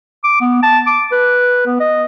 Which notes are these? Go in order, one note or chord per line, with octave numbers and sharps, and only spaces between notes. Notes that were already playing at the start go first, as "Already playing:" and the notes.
D6
B3
A5
D6
B4
B3
D#5